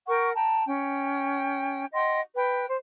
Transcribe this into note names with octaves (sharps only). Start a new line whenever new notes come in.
A#4 F#5 G5 C#6
G5 A5 A#5
C#4 G5
D#5 F#5 G5 C6
B4 G5
C5